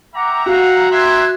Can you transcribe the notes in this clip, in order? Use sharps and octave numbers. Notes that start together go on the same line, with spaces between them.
E5 F#5 G5 A#5 D6
F#4 F5 F#5
G4 E5 A#5 C6 F#6 G#6